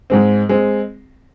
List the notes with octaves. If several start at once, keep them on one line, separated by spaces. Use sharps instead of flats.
G#2 G#3 C4
G#3 C4